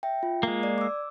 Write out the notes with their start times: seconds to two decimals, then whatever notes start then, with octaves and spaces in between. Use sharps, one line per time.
0.03 E5 G5
0.23 F4
0.43 G#3 A#3
0.63 D5
0.78 D6 E6